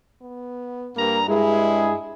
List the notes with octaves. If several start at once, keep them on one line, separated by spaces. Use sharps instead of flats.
B3
G2 A#3 A#5
G2 G#3 E4 G#4